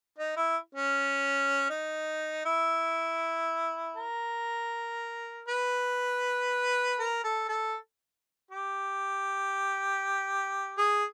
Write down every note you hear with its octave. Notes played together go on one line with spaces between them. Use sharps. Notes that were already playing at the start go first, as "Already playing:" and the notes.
D#4
E4
C#4
D#4
E4
A#4
B4
A#4
A4
A4
G4
G#4